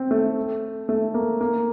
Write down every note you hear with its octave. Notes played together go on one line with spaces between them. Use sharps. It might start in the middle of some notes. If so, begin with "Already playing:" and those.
Already playing: C4
A3
A3
A#3
A#3